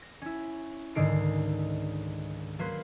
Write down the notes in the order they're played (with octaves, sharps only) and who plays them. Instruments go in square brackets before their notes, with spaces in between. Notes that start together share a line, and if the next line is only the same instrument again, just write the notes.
[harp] A#6
C#4 E4
C#2 G#2 D3 D#3 C7 D7
F#3 A#3 B4 C6